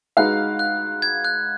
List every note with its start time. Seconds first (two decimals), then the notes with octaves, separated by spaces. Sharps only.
0.17 G#3 D#4 F#4 B4 F5 F#6
0.59 F#6
1.02 G#6
1.24 F#6